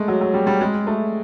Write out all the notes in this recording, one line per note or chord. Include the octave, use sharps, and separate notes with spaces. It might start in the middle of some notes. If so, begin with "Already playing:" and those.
Already playing: G#3 A3
F#3
F#3
G3
G3
G#3
A3